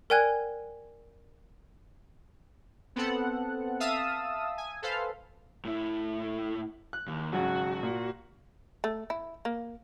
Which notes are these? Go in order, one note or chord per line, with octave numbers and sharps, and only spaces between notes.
A#4 D5 G5 G#5 F#6 G#6
B3 C4 A4 F#5
E5 F5 A5 D#6 E6
G#5
A4 B4 C5 F5
A2 E4
F#6
D#2
G#1 C#3 F#3 F#4
A#2
A3
E4
A#3